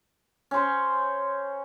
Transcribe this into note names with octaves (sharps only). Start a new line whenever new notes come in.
C#4 C5